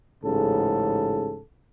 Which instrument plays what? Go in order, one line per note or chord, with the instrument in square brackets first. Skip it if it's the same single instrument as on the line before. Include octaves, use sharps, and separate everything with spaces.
[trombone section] A1 G#2 C#3 A4